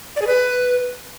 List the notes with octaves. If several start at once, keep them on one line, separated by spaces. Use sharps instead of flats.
D5
G#4
B4